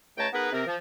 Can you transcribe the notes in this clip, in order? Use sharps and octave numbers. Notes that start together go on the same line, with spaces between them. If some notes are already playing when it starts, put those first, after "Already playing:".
C#2 A3 C#5 G5 A5 A#5
B3 D#4 G#4 A#4 B4
C3 C4 A#4
F3